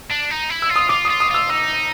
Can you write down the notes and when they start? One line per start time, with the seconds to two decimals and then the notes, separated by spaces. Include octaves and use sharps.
0.10 D4
0.30 D#4
0.50 E4
0.62 E6
0.69 F4
0.76 D#6
0.89 F4 D6
1.05 F4 D#6
1.20 D#6
1.30 F4 E6
1.49 D#4 E6